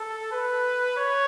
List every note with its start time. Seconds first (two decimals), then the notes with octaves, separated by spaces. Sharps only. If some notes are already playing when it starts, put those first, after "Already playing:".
Already playing: A4
0.32 B4
0.97 C#5